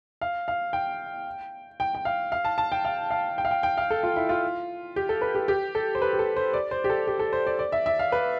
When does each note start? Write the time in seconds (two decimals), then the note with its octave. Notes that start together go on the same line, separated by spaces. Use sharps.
0.21 F5
0.48 F5
0.73 G5
1.80 G5
1.95 G5
2.05 F5
2.32 F5
2.45 A5
2.58 A5
2.72 G5
2.85 F5
3.10 F5
3.38 G5
3.45 F5
3.51 G5
3.63 G5
3.78 F5
3.91 A4
4.03 F4
4.16 E4
4.29 F4
4.96 G4
5.09 A4
5.22 B4
5.35 G4
5.48 G4
5.75 A4
5.95 C5
6.02 B4
6.13 G4
6.19 A4
6.37 C5
6.53 D5
6.71 C5
6.84 G4
6.90 A4
7.07 G4
7.19 A4
7.33 C5
7.47 D5
7.59 D5
7.72 E5
7.86 E5
7.99 F5
8.12 B4